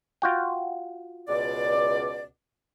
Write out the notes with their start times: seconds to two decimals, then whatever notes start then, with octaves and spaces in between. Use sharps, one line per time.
0.22 F4 F#4 G5
1.28 C#2 B2 D5